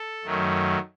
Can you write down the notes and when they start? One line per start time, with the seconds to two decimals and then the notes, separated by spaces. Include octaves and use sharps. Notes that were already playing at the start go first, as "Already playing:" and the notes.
Already playing: A4
0.24 F#2 D#3 F#3 A3